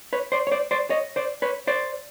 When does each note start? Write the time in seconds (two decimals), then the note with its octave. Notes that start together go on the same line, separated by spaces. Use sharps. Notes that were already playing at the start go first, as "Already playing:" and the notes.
0.13 B4 C#5
0.32 C5 D5
0.47 C#5
0.52 C5 D5
0.71 C5 D5
0.90 C#5 D#5
1.16 C5 D5
1.42 B4 C#5
1.67 C5 D5